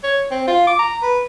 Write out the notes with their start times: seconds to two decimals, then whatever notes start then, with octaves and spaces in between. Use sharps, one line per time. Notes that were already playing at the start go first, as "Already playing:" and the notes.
0.03 C#5
0.31 C4
0.48 F4
0.67 D6
0.79 A#5
1.03 B4